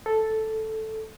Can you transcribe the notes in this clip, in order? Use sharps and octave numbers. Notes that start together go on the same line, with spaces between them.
A4